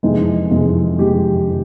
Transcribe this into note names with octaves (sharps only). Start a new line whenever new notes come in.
F2 C3 E3 G#3 D#4
F2 C3 E3 G#3
F2 C3 E3 G#3 G4
C3 E3